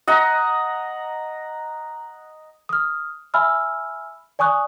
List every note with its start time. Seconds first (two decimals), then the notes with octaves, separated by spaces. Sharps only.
0.08 D#5 F#5 A#5
2.69 D#6 F6
3.34 E5 G#5 B5 E6 F6
4.39 D5 G#5 C#6 D#6 F#6